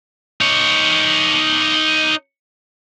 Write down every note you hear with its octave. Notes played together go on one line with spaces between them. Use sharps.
D#4 C#5